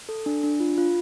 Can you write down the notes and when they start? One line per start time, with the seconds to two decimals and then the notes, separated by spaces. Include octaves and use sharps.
0.09 A4
0.26 D4
0.44 D4
0.60 F4
0.78 F4